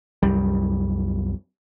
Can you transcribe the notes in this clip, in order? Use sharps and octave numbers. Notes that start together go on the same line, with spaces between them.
C2 F#2 G3